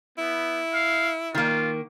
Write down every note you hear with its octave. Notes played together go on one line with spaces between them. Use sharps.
B3 E4
F5
D#3 A#3 F4